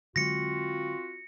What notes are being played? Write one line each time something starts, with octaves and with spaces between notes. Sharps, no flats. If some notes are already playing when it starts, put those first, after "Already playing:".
D3 F#3 G#3 C4 F4 F#4 A#6 C#7